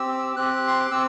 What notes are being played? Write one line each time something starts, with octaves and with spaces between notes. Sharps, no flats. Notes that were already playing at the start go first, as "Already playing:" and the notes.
Already playing: C4 G4 E6
C4 G4 F#6
C6
D6
C4 E6